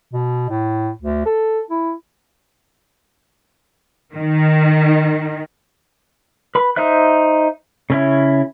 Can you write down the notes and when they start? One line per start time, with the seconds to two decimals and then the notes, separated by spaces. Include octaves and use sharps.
0.13 B2
0.50 A2
1.02 D2
1.26 A4
1.70 E4
4.14 D#3
6.55 B4 B5
6.76 D#4 C5 E5 F#6
7.90 C#3 C#4 E4